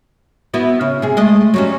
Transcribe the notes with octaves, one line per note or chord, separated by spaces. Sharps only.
B3 E4 F#4
C#3
C3 G#4
G#3 A3 D#5
F#3 G3 C#4